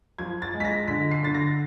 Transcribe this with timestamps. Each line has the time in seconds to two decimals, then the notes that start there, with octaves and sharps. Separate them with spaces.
0.18 F3 G#6
0.42 A6
0.54 G#3
0.60 B6
0.65 A#6
0.88 D3 B6
1.11 C7
1.23 D3 A6
1.35 A#6